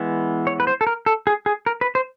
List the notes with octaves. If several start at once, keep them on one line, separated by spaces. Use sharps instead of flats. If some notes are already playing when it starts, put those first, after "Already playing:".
Already playing: E3 G#3 B3
C#5
B4
C5
A4
A#4
A4
G#4
G#4
A#4
B4
C5